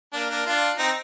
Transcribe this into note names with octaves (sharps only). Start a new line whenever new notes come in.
A#3 D4
A#3 D4
D4 F4
C4 D#4